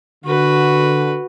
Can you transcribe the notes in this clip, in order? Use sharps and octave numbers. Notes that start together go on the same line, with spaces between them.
D3 F#4 B4